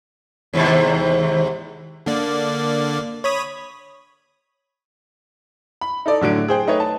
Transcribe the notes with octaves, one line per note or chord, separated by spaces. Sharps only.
D#2 G#2 C3
D3 A#3 D5
C#5 B5 D#6
B5
D#4 A4 D5
A2 D3 F#3 D7
G#4 C5 G5
A3 D#4 B4 C#5
A5